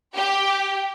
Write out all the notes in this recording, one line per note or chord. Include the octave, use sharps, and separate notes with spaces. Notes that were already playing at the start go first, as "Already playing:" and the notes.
G4 G5